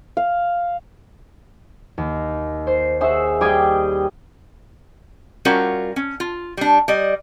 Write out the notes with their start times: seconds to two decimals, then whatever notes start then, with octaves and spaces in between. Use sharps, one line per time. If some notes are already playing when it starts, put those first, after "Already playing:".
0.17 F5
1.98 D#2
2.67 C5
3.01 G#4 C5 C#5 E5 F#5
3.41 G3 G4 G#4 D#5 G5 G#5
5.45 G3 C#4 F4 F#4 A#4
5.96 C#4
6.20 F4
6.57 G3 D4
6.88 G3 D5 D#5